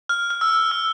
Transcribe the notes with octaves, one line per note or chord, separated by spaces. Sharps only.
F6
F6
E6
E6